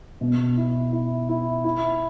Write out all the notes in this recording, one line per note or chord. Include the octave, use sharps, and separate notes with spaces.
B2
E4
E4
E4
E4